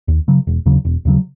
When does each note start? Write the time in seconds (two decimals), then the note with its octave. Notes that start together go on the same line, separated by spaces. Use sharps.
0.08 D#2
0.28 C#3 F#3
0.47 E1
0.66 D#2 C#3 F#3
0.85 E1
1.05 D#2 C#3 F#3